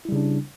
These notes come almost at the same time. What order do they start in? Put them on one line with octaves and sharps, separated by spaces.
E4 G3 C#3 D4